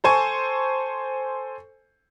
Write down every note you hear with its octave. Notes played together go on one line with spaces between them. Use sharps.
A4 C5 G#5 C#6